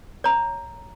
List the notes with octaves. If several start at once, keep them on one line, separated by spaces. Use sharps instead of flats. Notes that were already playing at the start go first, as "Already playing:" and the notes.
C#5 A#5